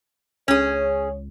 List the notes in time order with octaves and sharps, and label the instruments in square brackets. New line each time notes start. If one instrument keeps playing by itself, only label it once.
[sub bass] C#2 [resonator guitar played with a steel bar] C#4 G#4 [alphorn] C#5